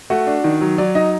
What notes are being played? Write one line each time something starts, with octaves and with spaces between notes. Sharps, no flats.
A3 F#4
D4
D#3
F#3
F#3 D5
D#4 D#5